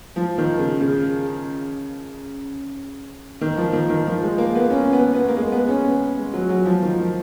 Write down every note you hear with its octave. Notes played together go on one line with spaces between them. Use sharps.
F3
D#3
C#3
C#3
D#3
F3
D#3
D#3
F3
G#3
A#3
B3
C#4
B3
B3
A#3
G#3
B3
C#4
B3
G#3
F#3
F#3
F3
D#3
F3